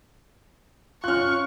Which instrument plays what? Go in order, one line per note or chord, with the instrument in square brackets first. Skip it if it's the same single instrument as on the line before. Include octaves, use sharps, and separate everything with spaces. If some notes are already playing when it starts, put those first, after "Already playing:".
[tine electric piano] C#4 F4 [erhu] C#6 [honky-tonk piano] F6 F#6